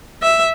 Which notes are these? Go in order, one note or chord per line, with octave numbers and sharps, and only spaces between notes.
E5